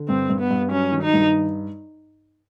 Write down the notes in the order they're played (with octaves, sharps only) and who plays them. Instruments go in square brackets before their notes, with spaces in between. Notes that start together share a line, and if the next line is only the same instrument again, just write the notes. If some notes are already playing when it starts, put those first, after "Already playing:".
Already playing: [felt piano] D3
[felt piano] G2 [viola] C4
[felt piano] G2
[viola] B3
[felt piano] G2
[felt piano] F#3 [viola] C#4
[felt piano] D#3
[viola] D#4
[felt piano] G2